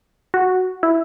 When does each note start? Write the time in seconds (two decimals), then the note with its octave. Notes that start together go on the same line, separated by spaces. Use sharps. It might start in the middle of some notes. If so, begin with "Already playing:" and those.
0.34 F#4
0.83 E4